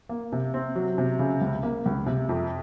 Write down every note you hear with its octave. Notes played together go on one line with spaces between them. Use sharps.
A#3
C3
C4
F#3
C3
C#3
C#2
A#3
C#2
C3
F2